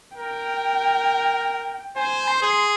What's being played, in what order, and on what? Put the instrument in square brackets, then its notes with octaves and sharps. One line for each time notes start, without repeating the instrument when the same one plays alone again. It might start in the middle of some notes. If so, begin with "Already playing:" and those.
[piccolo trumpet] A#4 [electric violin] G5
[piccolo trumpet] C5 [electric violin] G#5
[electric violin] C6
[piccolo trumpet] G#4